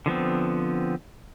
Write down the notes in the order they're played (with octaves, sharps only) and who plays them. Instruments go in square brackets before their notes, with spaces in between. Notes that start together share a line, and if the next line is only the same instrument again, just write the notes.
[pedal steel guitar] D3 F3 B3 C4